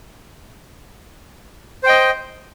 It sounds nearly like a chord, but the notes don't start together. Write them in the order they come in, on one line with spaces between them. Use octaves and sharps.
C5 G5 D#5